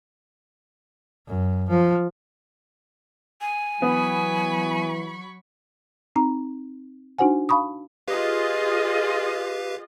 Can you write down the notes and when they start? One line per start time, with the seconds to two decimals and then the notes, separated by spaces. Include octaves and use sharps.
1.28 F#2
1.70 F3
3.41 G#5
3.82 E3 F#3 B3 B5 C#6
6.16 C4 D#4 A#5
7.19 D4 D#4 F#4 C5 F#5 G#5
7.49 F5 A5 B5 C#6 D#6
8.08 F4 G4 G#4 B4 D#5 F5